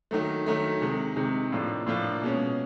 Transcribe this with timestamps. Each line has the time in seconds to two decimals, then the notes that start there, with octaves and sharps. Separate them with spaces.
0.11 D#3 F#3 A3
0.46 D#3 F#3 A3
0.81 C3 D#3 G#3
1.16 C3 D#3 G#3
1.52 A2 F3 A#3 D4 F4
1.87 A2 F3 A#3 D4 F4
2.22 B2 G#3 C#4